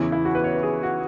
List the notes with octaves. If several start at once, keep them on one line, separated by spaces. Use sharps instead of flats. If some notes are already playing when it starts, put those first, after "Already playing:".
Already playing: E2 C#3 E3 E4
E4
F#4
B4
C#5
B4
G#4
F#4